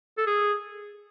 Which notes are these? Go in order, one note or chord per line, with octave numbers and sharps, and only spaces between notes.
A4
G#4